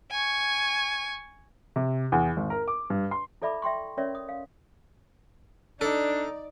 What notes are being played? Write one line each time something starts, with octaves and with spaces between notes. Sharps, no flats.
G#5 C#6
C3
E2
G#1
A#4
D6
G2
C6
E4 A4 D5 E5 B5 D6
E5 G5 C6 C#6
C#4 A#4 C#5 D5 E5
D#6
F5
D4 D#4 A4 D5